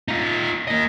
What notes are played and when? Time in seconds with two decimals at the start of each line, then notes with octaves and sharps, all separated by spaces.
0.08 D#4 F4
0.68 A#3 D#5